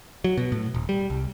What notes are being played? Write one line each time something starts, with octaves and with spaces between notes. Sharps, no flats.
F#3
B2
A2
D#1
G3
C2